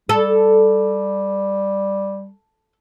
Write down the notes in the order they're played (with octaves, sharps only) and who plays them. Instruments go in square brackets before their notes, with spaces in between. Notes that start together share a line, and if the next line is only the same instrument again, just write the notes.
[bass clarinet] G3 [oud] A4